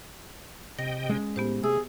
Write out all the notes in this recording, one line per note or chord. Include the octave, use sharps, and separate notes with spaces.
C3 D#5 G5 A#6
G#3 C#4
A2 B3 G4 C5
C3 A3 G#4 E6